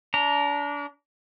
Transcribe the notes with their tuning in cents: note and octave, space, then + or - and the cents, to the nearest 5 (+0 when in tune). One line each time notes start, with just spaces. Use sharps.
D4 -30 A#5 +0